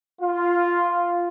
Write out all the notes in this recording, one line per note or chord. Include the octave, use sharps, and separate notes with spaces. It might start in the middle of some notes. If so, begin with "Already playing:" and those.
F4